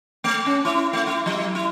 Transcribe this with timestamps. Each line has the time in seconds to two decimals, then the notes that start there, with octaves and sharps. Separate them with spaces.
0.24 A3
0.46 C#4
0.65 E4
0.93 A3
1.07 E4
1.26 F#3
1.55 E4